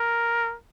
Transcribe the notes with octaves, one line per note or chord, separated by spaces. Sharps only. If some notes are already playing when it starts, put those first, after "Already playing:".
Already playing: A#4